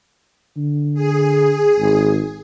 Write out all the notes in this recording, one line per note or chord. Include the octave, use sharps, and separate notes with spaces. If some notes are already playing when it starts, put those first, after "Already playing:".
D3
G#4
G#1